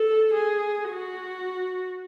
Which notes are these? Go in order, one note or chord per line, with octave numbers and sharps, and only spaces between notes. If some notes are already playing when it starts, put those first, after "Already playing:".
Already playing: A4
G#4
F#4